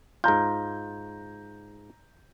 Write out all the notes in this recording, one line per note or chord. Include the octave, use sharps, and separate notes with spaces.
G#2 F4 A#5 G6